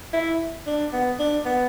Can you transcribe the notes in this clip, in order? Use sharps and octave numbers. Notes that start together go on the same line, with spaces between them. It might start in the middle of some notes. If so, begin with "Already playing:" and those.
E4
D4
B3
D4
B3